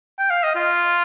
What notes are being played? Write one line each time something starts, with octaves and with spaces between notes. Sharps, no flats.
G5
F5
D#5
F4